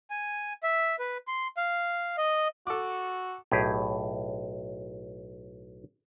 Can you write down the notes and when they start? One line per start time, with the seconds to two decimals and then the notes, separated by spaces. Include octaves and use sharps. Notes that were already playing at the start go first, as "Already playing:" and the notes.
0.10 G#5
0.63 E5
0.99 B4
1.27 C6
1.57 F5
2.17 D#5
2.67 F#4 A4 D6
3.51 B1 A2 G4 G#4